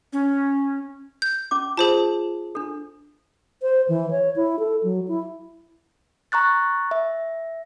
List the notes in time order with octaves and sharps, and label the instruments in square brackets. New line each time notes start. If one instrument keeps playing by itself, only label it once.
[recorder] C#4
[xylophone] G6
[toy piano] C#4 D6
[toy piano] F4 [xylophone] G#4 C5 A5
[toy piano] D4 A4
[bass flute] C5
E3
C#5
E4
A4
F#3
E4
[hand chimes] A#5 C#6 F#6 A6
E5